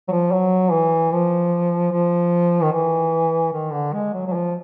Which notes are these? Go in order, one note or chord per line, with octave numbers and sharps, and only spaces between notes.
F#3
F3
F#3
E3
F3
F3
D#3
E3
D#3
D3
G#3
F#3
F#3
F3